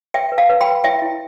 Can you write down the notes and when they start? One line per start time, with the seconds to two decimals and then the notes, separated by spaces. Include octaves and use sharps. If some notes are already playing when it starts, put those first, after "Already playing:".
0.14 B4 E5 G5
0.32 B4
0.38 F5 A5
0.49 B4
0.61 G5 B5
0.67 B4
0.84 E4 E5 G5
1.02 E4